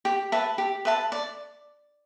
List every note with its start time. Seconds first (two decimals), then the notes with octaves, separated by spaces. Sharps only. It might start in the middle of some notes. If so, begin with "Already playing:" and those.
0.05 G4
0.32 B4 E5 A5
0.58 G4
0.85 B4 E5 A5
1.12 D5